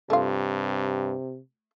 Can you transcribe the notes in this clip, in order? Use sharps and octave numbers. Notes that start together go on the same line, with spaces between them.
G2 C3 A3 F4